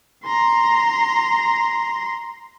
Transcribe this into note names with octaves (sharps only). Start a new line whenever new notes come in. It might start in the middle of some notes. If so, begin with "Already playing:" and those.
A#5 C6